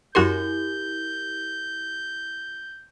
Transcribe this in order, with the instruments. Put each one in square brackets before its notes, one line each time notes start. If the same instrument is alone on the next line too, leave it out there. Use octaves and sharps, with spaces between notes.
[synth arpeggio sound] F#2 F#4 C6 [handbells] E4 G4 A#4 [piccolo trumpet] G6